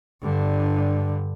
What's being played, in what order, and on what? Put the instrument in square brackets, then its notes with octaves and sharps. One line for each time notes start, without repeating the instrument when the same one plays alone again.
[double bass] G2 D3